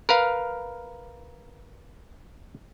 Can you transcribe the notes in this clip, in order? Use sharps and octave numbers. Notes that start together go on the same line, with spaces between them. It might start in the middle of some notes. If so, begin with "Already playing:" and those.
A#4 B4 F5